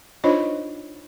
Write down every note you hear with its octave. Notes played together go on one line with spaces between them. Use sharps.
D4 D#4 F4 C5 C#5 D#5